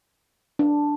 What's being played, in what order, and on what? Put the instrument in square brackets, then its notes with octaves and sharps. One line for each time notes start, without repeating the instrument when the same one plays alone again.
[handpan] D4